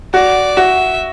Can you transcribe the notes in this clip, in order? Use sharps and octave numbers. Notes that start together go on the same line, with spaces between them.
F#4 D5
F#4 E5